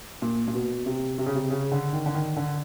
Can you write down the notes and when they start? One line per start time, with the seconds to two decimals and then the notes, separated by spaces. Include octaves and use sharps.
0.22 A#2
0.48 A#2
0.54 B2
0.86 C3
1.18 C3
1.26 C#3
1.35 C3
1.50 C#3
1.72 D3
1.93 D#3
2.06 D3
2.14 D#3
2.36 D3